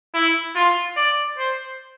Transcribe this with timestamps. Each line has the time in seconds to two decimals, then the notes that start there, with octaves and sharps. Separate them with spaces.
0.15 E4
0.56 F4
0.97 D5
1.38 C5